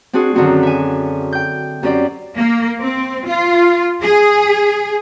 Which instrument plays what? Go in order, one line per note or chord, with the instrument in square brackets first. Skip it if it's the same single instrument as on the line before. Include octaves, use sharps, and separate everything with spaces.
[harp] C4 D4 F#4 G#4
F#2 D3 D#3 C4 F#4
E5 G#5
G5 G6
F#2 C4 G4 D5 G5
[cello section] A#3
C4
F4
G#4